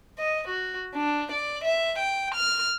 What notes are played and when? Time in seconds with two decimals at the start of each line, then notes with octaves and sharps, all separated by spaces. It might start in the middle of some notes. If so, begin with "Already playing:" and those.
0.18 D#5
0.48 F#4
0.95 D4
1.32 D5
1.64 E5
1.99 G5
2.35 F6